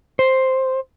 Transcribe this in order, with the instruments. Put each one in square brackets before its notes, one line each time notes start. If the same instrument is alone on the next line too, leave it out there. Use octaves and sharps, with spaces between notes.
[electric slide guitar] C5